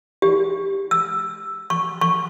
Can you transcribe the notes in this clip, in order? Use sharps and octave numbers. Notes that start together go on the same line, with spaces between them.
G4
E6
C#6
C#6